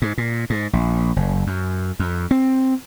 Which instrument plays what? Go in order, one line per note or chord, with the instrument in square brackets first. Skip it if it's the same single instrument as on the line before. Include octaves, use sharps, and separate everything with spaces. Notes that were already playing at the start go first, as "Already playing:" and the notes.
[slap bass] G#2
A#2
G#2
A#1
F#1
F#2
F2
C4